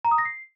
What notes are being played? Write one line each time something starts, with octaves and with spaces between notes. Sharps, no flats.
A#5
D#6
A#6
C7